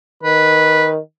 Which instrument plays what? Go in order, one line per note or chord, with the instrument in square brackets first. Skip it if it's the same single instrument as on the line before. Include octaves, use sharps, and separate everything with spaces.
[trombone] D#3 [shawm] B4